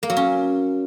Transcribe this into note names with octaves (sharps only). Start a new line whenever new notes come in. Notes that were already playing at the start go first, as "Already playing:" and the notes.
A#3
F#3
C#4